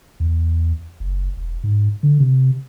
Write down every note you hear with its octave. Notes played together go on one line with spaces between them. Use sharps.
E2
F#1
E1
G#2
D3
C3